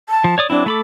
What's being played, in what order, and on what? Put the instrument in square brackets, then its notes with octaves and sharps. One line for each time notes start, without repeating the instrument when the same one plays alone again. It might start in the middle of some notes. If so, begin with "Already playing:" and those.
[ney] A5
[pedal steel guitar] F3
C#5 D5 D#6
[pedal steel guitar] F#3 C4 E4 [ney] D4
[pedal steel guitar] A3 B5 D6 [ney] A4